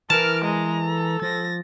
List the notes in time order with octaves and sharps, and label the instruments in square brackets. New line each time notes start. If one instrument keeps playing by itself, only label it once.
[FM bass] E3 [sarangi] A#4 [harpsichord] A5 [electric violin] F6 D7
[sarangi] G#3 [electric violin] A#5
[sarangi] A4
[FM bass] F3 [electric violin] A6 A#6